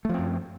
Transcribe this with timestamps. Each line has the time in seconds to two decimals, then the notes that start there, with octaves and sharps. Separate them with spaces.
0.05 A3
0.09 F3
0.14 C4
0.19 F#2